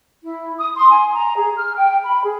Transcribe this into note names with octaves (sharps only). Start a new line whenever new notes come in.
E4
D#6
C6
G#5
A#5
G#4
F6
G5
B5
G#4